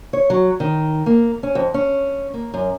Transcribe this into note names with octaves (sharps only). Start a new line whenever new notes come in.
C#5
F#3
D#3
A#3
C#4
F2
C#4
A#3
F#2